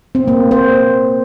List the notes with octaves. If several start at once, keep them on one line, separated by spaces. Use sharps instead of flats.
C4
A#3
C5